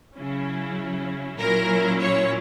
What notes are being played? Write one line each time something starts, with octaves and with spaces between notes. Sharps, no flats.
C#3 F#3 C#4 E4
A#2 F#3 C#4 E4 A#4
C#5